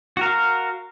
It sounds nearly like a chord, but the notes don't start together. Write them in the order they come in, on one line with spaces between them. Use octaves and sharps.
F#4 A#4 F5